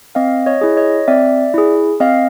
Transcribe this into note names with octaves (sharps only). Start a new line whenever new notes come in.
C4 D#5 F5
C#5 D#5
E4 G#4
C#5 D#5
C4 D5 E5
E4 G#4
C4 D#5 F5